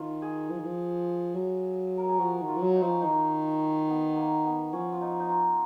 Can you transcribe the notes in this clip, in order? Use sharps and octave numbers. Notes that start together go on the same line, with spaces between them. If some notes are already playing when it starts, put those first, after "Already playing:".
Already playing: D#3 F4
G#4
F3
D#3
F3
F#3
A#4
G#4
F3 F#4
D#3
F4
F3
F#3
D#4
F3
C#4
D#3 D#4
B3
A#3
B3
F3 C#4
F4
D#4
D#4
F4